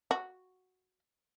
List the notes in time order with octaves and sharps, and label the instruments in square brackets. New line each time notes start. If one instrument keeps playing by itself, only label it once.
[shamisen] F#4